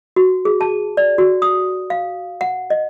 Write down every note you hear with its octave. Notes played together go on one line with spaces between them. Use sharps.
F#4
G#4
A5
D5
F#4
D#6
F5
F#5
D#5